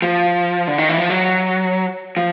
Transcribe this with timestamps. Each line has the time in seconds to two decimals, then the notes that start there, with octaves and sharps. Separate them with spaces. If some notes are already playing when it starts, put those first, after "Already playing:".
0.02 F3
0.68 D3
0.78 D#3
0.89 E3
0.98 F3
1.10 F#3
2.17 F3